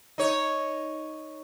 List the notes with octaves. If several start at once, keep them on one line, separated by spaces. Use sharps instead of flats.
D#4 C#5